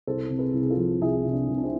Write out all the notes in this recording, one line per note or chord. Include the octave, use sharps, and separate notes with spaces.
C2 A4 C5
C3
G#4 B4
C2
G#4
F4 A4
F3
C2 E4 G#4
C3 E4
D4
C2
D4
C4 E4